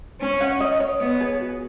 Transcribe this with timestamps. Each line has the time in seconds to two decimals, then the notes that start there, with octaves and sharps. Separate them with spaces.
0.21 C#4
0.40 F#5
0.60 D#5
0.80 C#5
1.00 B3 C#5
1.20 G#4
1.40 F#4